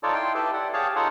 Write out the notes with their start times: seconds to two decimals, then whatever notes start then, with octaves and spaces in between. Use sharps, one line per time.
0.03 D#4 F4 A4 C#5 D5
0.14 E4 G5 C6
0.35 E4 G4 A4 B4
0.53 D5 F#5
0.73 G4 G#4 C#5 F5 A5
0.96 D#4 F4 A4 C#5 F#5